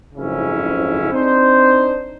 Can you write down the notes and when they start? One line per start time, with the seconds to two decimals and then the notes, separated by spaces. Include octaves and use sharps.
0.15 F#1 F2 G#2 C#3 C#4 E4
1.12 C4 D4 D#4 C5